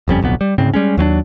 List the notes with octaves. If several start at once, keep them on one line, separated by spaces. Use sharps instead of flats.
F#1 F2 G3 C#4
D1 B1 F2 B3
G3
D2 G#2 C#3 C4
G3 G#3 C#4
D#2 F#3 C4 D4